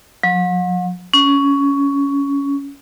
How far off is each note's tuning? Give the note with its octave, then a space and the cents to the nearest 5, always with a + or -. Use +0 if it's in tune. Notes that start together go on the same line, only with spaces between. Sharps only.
F#3 -45
C#4 +15